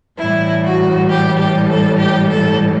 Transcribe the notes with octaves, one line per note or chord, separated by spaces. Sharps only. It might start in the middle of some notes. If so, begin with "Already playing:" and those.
A2 E3 G3 E4
F#4
G4
G4
A4
G4
A4